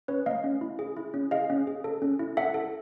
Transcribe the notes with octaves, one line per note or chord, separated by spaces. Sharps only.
C#4 B4 C#5
A3 D#5 F5
C#4
E4
G#4
E4
C#4
G#4 D#5 F5
C#4
G#4
A4
C#4
E4
A4 E5 F#5
A4